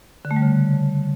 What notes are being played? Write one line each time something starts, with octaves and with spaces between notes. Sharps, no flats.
D3
A3
G3
C#3